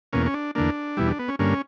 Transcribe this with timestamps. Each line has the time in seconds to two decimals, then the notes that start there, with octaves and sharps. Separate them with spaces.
0.13 E2 B2 A#3 C#4
0.27 C#4
0.34 D4
0.55 E2 D3 A#3 D4
0.97 E2 B2 G3 E4
1.07 D4
1.19 B3
1.28 C#4
1.39 G2 D3 A#3 C#4